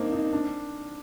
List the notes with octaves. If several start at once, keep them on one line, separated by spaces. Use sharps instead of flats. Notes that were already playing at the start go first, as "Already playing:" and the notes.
Already playing: A#3 C4 D4 D#4
D#4
D4